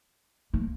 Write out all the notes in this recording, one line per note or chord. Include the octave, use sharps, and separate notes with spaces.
A#3